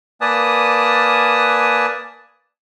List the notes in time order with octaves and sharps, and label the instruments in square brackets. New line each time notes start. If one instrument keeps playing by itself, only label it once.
[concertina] A#3 B4 D5 G#5 A5 D#6